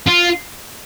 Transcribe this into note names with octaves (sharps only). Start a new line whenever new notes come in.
F4